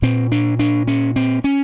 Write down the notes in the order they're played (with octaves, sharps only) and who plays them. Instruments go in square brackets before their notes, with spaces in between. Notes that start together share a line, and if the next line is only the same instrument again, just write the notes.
[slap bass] A#2 C4
D4
D4
C#4
C4
C#4